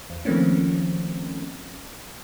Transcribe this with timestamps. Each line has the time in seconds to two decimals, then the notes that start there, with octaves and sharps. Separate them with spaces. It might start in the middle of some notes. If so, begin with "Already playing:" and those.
0.10 E2
0.25 D#3 F3 A3 A#3 C4 C#4